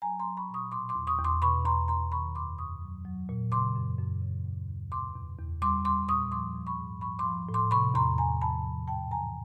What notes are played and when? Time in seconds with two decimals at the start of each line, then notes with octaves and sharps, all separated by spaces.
0.02 F#3 G#5 A#5
0.20 A#5 C6
0.25 F#3
0.37 B5 C#6
0.49 A#2 C#6 D#6
0.72 B2 C6 D6
0.89 C6 D6
0.95 E2
1.07 C#6 D#6
1.18 E2
1.24 C6 D6
1.42 B2 B5 C#6
1.65 E2 A#5 C6
1.88 E2 A#5 C6
2.12 D#3 B5 C#6
2.35 F#2 C6 D6
2.58 F#2 C#6 D#6
2.82 F#3
3.05 F#3
3.29 A#2
3.52 C#3 C6 D6
3.75 F#2
3.99 F#2
4.21 C#3
4.45 D#2
4.69 D#2
4.92 B2 C6 D6
5.15 E2
5.39 E2
5.62 G3 C6 D6
5.85 G3 C6 D6
6.08 A#2 C#6 D#6
6.32 F3 C6 D6
6.55 F3
6.67 B5 C#6
6.79 G#2
7.01 F3 B5 C#6
7.19 C6 D6
7.25 F3
7.49 A2
7.54 C6 D6
7.71 C3 B5 C#6
7.94 E2 A#5 C6
8.18 E2 G#5 A#5
8.41 F3 A5 B5
8.65 F3
8.88 G#2 G5 A5
9.11 E3 G#5 A#5